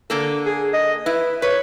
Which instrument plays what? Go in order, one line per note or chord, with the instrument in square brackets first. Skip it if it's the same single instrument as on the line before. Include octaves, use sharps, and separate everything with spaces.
[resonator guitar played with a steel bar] D3 A#3 A4
[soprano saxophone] G#4
D#5
[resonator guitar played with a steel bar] E4 [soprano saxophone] B4
[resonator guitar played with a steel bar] B4 [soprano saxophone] C#5